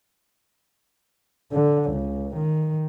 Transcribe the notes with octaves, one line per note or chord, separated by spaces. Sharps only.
D3
C#2
D#3